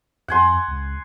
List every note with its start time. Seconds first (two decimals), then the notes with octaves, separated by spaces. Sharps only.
0.28 F2 F#5 G#5 C6
0.68 C#2